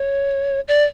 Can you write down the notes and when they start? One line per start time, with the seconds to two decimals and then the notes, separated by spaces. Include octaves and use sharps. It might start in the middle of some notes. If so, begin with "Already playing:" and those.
Already playing: C#5
0.68 D5